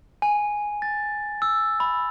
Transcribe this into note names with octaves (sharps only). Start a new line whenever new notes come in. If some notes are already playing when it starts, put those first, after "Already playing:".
G#5
A6
E6
B5